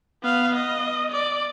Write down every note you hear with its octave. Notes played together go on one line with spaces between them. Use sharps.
B3 F5
D#5
D5